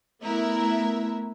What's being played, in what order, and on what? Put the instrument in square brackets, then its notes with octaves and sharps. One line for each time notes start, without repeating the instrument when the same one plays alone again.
[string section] A3 B3 E4 A#4 E5